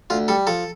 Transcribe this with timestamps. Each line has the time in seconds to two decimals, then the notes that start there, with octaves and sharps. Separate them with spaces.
0.10 D2 F4
0.28 G3 A4
0.47 F3 A4